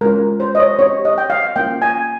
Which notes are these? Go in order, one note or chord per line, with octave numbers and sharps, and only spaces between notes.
G#3 C#4 F4 A#4
C5
D#5
C#5
C4 D#4 G4 C#5
D#5
G5
F5
A#3 C#4 F4 G5
G#5